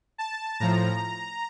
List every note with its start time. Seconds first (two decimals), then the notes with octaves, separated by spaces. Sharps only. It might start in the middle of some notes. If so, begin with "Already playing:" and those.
0.18 A5
0.60 A2 F3 A#5